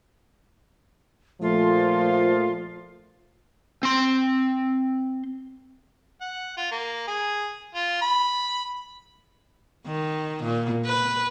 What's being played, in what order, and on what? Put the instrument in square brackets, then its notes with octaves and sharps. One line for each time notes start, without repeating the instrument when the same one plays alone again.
[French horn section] A#2 F3 A3 [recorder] F4
[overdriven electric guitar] C4 C6
[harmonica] F#5
F4
A#3
G#4
F4
B5
[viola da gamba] D#3
A#2
B4